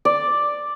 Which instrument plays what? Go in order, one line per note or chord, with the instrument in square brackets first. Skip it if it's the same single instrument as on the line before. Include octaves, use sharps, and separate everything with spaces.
[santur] D5